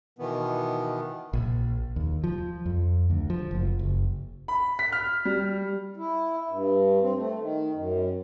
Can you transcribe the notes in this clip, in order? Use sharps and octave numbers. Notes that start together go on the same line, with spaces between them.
B2 D#3 E3 B3
A#1
D#2
F3
F2
D2
F3
F#1
F#1
B5
B6
F6
G3
E4
G2
C4
A3
D#3
F#2